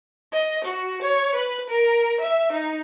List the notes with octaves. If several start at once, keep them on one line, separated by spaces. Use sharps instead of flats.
D#5
F#4
C#5
B4
A#4
E5
D#4